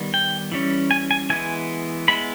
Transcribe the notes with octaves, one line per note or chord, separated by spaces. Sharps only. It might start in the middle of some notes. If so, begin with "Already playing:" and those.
Already playing: D#3 G3 B3
G5
E3 G3 C#4
G#5
G#5
E3 G#3 B3 G#5
G#3 B3 E4 B5